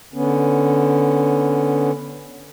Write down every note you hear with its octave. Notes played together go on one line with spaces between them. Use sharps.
D3 B3 C#4